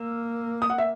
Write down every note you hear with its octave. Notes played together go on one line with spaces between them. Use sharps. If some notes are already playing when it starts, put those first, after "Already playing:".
Already playing: A#3 E6
D#6
F#5
E5